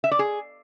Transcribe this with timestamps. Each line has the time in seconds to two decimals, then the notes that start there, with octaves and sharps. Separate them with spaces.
0.04 E5
0.11 D5
0.19 G#4